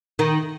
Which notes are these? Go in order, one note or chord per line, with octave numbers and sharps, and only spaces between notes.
D#3